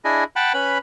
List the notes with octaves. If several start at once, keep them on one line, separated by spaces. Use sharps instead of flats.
D4 E4 G#4 D#5
F#5 G5 A5 B5
C#4 B4 B5